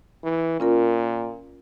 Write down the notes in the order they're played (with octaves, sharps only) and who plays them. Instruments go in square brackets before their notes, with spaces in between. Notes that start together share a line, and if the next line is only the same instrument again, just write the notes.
[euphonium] E3
[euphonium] A#2 [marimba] C#4 F4 A#4